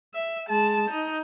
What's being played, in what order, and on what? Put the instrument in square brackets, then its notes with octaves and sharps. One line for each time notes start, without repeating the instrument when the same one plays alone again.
[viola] E5
G#3 A5
D#4